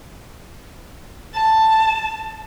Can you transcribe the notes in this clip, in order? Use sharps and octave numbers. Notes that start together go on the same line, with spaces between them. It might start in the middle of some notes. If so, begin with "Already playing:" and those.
A5